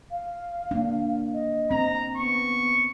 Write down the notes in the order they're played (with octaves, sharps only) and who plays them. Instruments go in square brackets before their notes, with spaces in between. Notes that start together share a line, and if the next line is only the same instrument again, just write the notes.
[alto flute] F5
[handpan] A#3 D4
[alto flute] D#5
[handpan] C4 [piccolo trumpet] A#5
[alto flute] B3 [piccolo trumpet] C#6